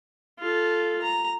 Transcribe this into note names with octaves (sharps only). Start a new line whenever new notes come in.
F4 A4
A#5